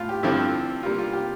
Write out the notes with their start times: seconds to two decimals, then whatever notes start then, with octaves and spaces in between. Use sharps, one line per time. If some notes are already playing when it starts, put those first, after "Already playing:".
Already playing: A2 F4
0.09 G4
0.23 G2 D3 F3 C4 E4
0.83 C3 G3 A#3 F4
0.99 F4
1.13 G4